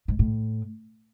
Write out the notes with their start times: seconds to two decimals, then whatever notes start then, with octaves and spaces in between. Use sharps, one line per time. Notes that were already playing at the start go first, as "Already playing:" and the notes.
0.08 G#2
0.19 A2